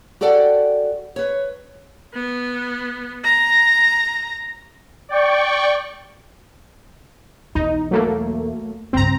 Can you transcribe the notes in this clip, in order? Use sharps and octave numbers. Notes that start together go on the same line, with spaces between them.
F#4 G4 A4 D5 F#5 G5
B4 C#5
B3
A#5
D5 G5 C#6
B1 E2 D#4
F#3 A3 A#3
C#2 G2 C4 A#5